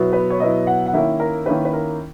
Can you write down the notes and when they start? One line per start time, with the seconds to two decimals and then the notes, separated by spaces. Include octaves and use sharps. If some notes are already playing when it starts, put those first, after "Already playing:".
Already playing: B2 F#3 B3 E4
0.13 B4
0.30 C#5
0.39 B2 F#3 B3 E4 D#5
0.67 F#5
0.86 F#5
0.93 D#3 A#3 C#4 E4 E5
1.20 A#4
1.46 D#3 A#3 C#4 E4 B4
1.65 B4
1.73 A#4